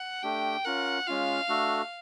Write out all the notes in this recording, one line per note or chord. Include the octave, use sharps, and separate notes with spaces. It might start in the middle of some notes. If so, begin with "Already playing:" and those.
Already playing: F#5
A3 D4 G4 G5
C#4 F4 A#4 F#5
G#3 C#4 F4 F5
A3 D4 F#4 A4